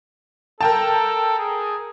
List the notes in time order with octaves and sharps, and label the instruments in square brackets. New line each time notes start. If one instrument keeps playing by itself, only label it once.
[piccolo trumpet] A4 [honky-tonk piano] A#4 G5 A5
[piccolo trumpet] G#4